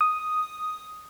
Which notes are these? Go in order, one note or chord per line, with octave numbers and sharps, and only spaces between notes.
D#6